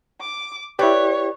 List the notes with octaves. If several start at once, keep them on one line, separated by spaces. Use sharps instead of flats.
D6
E4 G4 B4 C#5 D5